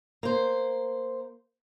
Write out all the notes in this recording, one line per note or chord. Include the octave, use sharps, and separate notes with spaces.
A#3 C5